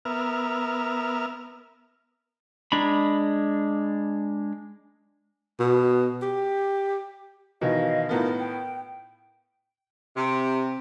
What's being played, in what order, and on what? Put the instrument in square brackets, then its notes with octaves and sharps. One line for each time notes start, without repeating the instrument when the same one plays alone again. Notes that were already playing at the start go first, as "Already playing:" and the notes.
[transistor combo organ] B3 A#4 E5 F6
[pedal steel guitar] G#3 D4 A#5 B5
[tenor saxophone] B2
G4
[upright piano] B2 D#3 E3 [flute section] D#5 F5
[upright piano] A2 B3 F4 [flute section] D#4 A#4 A5
[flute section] G5
[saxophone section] C3